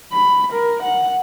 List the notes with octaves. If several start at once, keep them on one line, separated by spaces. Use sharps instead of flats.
B5
A#4
F#5